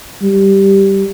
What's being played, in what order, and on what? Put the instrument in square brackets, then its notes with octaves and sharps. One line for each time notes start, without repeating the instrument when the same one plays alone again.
[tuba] G3